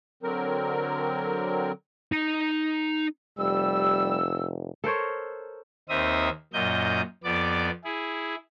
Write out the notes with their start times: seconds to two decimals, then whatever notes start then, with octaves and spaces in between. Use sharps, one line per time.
0.23 D3 F#3 C4 A#4
2.12 D#4 A#5
3.39 F1 G3 E6
4.84 A4 A#4 C5 C#5
5.89 D#2 C4 D#4 E5 D#6
6.53 F#2 A#2 D#5 G6
7.24 F2 B3 D5 D6
7.84 E4 G#4